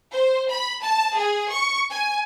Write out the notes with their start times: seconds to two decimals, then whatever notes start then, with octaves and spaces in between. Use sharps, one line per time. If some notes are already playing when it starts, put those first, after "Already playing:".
0.11 C5
0.51 B5
0.83 A5
1.16 G#4
1.50 C#6
1.90 G#5